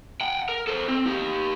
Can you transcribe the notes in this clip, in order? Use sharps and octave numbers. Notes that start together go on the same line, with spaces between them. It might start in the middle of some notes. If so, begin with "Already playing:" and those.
F#5 G5
A#4
A4 C5
C4
D#4 G4